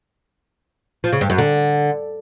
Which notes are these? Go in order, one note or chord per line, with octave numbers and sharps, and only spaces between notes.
F3
C#3
G2
F#2
D3